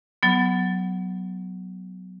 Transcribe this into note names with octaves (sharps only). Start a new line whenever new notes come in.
F#3 B3